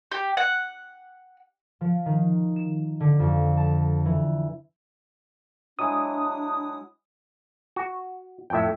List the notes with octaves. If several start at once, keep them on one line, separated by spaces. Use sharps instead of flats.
G4
F#5
F3
D#3
E7
D3
F2
A5
E3
F#3 G#3 D4 E4 D#6
F#4
F2 A2 E5 G5